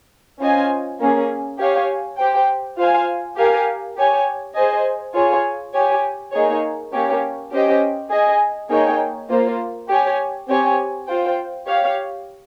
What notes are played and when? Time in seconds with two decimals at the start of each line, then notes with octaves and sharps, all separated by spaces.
0.39 C#4 F4 C5 D#5 G#5
1.00 A#3 C#4 G#4
1.59 G4 C#5 F5 G#5
2.18 G4 C5 G5
2.77 F4 C5 F5 G#5
3.37 G4 A#4 F5 G#5
3.96 G4 C#5 G#5
4.56 G#4 C5 D#5 G#5
5.14 F4 G#4 C#5 G#5
5.73 G4 C#5 G#5
6.32 A#3 D#4 G#4 C#5
6.93 A#3 C#4 G4 C#5
7.52 C#4 G4 C5 D#5 G5
8.11 G#4 D#5 G#5
8.70 A#3 D#4 G#4 C#5 G5
9.29 A#3 F4 C5
9.89 G4 C#5 G#5
10.48 C4 G4 C#5 G#5
11.08 F4 C5 G5
11.67 G4 C#5 F5